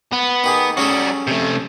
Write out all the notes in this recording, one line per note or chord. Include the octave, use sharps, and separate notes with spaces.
B3
D#3 G4 G#4
G3 C#4 F#4 G#4 A4
C3 A3